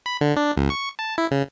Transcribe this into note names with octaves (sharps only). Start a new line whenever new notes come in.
B5
D3
D4
C#2
C#6
A5
E4
C#3